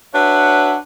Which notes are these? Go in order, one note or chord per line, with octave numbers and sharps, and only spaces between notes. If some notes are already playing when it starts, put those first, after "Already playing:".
D4 F#4 B4 C#5 E5 F#5